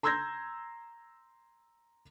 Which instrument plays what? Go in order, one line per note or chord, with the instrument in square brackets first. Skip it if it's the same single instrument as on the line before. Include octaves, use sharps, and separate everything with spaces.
[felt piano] A#5 C6 E6 G6 G#6 A#6